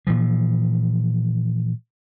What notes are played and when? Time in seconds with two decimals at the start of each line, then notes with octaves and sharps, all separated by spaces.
0.07 A#2 E3 F3